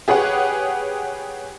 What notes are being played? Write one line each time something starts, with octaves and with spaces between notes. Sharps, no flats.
G4 G#4 B4 C#5 F#5